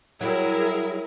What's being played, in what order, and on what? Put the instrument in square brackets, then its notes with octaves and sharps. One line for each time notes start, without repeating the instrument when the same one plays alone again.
[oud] F#3 G3 [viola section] E4 G#4 A#4